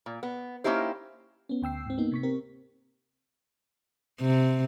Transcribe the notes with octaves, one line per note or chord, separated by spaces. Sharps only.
A#2
B3
A#3 C#4 D#4 E4 G4 C5
B3 C#4
D2 G5 E6 C7
G#2 C4
A#3 B3 D#4
C3 C#6 B6
C4 G4 A#4
C3